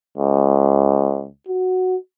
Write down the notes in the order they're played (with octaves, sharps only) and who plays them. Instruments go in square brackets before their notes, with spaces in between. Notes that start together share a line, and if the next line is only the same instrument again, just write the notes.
[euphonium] C#2
F#4